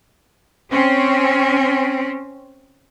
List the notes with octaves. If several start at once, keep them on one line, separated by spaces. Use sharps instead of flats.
C4 C#4